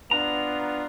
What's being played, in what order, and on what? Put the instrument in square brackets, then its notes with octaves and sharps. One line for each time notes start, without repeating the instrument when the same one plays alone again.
[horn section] B3 D4 F4 [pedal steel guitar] A#5